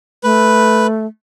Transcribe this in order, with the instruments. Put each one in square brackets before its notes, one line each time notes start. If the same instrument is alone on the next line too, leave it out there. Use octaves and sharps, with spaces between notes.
[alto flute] A3 [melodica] B4